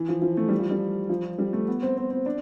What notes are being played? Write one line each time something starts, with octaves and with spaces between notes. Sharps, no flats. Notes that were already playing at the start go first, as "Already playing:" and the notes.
Already playing: E3
F3
F3
A3
G3
F3
G3
F3
G3
A3
B3
C4
C4
C4
D4